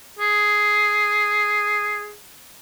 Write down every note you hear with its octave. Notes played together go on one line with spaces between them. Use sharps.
G#4